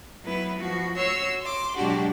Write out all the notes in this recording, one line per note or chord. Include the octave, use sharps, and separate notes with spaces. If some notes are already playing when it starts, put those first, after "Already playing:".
F#3 B3 E4 B4
F3 F#4
F#4 C#5 C6 E6
C6 D6
B2 F#3 G#3 D4 F#4 G4